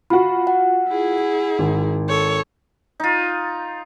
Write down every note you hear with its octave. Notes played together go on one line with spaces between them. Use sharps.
F4 F#4 B5
F#5
E4 G#4
G#1
A4 C#5
D#4 F4